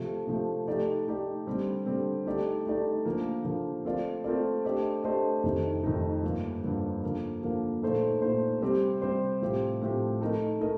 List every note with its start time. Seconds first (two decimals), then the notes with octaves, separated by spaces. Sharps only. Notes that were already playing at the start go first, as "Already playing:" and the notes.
Already playing: C3 F3 A3
0.27 C3 F3 A3
0.68 A3 D#4 G4 D5
1.08 A3 D#4 G4 D5
1.47 D3 G3 C4
1.86 D3 G3 C4
2.26 A3 D#4 G4 D5
2.66 A3 D#4 G4 D5
3.05 D3 F3 A#3
3.45 D3 F3 A#3
3.85 A3 C4 F4 A#4 D5
4.24 A3 C4 F4 A#4 D5
4.65 A3 D4 G4 C5 D#5
5.04 A3 D4 G4 C5 D#5
5.44 F2 C3 D#3 A3 D#4
5.84 F2 C3 D#3 A3 D#4
6.23 G2 D3 F3 A#3
6.63 G2 D3 F3 A#3
7.03 D3 F3 A#3
7.42 D3 F3 A#3
7.83 A#2 A3 D#4 A4 C5
8.22 A#2 A3 D#4 A4 C5
8.62 C3 G3 C4 G4 C5
9.02 C3 G3 C4 G4 C5
9.41 A2 F3 C4 G4
9.81 A2 F3 C4 G4
10.21 A3 D#4 A#4 D#5
10.60 A3 D#4 A#4 D#5